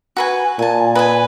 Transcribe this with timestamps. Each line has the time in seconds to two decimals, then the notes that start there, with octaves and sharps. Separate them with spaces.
0.16 F#4 B4 G#5
0.59 A#2 G#5 A5
0.95 B4 D#5 G#5